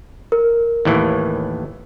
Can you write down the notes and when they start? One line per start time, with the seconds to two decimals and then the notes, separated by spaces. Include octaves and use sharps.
0.32 A#4
0.85 D#2 A2 E3